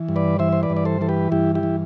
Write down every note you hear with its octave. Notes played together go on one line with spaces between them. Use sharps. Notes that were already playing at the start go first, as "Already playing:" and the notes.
Already playing: E3
G2
B4 D5
E3 C5 E5
C5
B4 D5
G2
D5
A4 C5
E3 A4
G4 B4
G2 E4 G4
E4 G4
E3